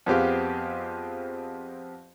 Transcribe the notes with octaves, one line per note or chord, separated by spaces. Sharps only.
F2 B3 C4 G4 G#4 F5